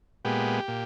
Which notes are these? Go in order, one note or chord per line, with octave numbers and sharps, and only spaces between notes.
A#2 G#3 B3 G4
A#2